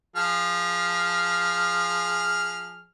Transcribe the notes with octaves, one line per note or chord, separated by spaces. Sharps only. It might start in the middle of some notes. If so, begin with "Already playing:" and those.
F3 G#4 F6